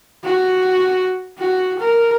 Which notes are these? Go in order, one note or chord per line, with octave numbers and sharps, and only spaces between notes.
F#4
F#4
A#4